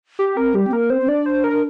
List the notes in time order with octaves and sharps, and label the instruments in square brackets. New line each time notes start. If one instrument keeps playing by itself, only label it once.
[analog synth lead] G4
[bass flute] C4 [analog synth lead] A#4
[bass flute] G3 [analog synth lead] G4
[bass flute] C4
[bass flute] A#3 [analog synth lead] A#4
[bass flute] C4 [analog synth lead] C5
[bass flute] C4
[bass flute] D4 [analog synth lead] D5
[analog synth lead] C5
A#4